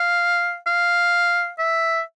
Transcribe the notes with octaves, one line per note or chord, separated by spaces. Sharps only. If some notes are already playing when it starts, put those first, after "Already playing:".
Already playing: F5
F5
E5